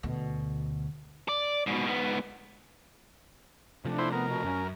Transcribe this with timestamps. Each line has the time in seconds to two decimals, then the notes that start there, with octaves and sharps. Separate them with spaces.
0.03 D2 B2
1.29 D5
1.67 G#2 B2
1.86 G#2 B3
3.85 C3 F3 A3 D4
3.99 E4 C5
4.12 B3 A#4
4.28 B2
4.44 F#2 C#4